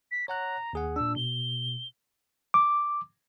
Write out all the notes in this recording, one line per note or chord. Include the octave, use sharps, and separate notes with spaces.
B6
C#5 F#5 A#5 F#6
D#2 G#4 F#5
A#2 D4 E6
B2 G7
D6